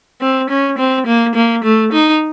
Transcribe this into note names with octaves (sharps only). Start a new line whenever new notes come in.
C4
C#4
C4
A#3
A#3
A3
D#4